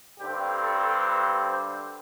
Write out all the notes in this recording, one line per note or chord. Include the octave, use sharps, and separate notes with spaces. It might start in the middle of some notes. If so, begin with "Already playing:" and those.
G2 D3 G3 C4 G4
A4
B4
C5